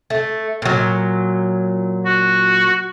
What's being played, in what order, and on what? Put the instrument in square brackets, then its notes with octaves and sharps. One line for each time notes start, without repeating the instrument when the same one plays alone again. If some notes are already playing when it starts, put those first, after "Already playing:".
[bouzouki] A3
A#2 F#3
[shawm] F#4